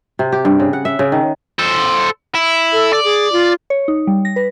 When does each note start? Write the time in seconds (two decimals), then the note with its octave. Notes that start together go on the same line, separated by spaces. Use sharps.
0.19 C3
0.32 G4
0.45 G2
0.60 C#3
0.73 F#5
0.85 E5
0.99 C#3
1.12 D#3
1.59 A4 C5
2.35 E4
2.72 A4
2.93 D5
3.04 G#4
3.32 F4
3.70 C#5
3.88 D#4
4.07 G3
4.25 A#6
4.36 B4